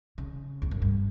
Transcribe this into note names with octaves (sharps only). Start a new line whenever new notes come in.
C#3
E2
F#2
G2